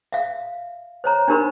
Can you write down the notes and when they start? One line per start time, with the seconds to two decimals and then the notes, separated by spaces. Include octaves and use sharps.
0.12 E5 F5
1.04 C5 C#5 A#5
1.28 D4 D#4 G4 A#4 C5 B5